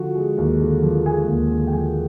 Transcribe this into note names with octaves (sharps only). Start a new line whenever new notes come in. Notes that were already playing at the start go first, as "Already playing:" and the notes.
Already playing: D3 F3 F#4
G#3
D#2
D3
F3
G#3 G#4 G#5
D#2
D3
G5
F3 G#4 G#5